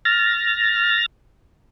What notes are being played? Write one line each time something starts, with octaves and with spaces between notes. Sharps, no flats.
F6 A6 A#6